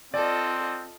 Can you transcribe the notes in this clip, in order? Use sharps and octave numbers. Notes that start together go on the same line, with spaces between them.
C4 F4 A4 D5 D#5